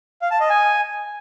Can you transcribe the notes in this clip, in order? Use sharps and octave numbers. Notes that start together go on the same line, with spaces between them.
F5
A5
D#5
G#5